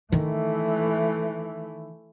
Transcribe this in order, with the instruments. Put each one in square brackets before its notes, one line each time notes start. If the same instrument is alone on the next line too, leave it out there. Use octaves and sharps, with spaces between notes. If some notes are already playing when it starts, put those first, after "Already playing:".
[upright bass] D#3 [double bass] E3 A3